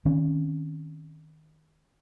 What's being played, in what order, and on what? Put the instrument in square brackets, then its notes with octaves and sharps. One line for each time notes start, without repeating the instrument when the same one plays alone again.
[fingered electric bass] D#3 C4 C#4